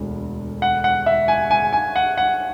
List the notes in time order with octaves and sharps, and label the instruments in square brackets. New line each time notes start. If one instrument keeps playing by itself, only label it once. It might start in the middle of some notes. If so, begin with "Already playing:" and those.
Already playing: [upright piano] E1 D2
[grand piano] F#5
F#5
E5
G#5
G#5
G#5
F#5
F#5